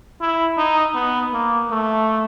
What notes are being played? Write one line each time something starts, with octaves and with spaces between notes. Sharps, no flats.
E4
D#4
B3
A#3
A3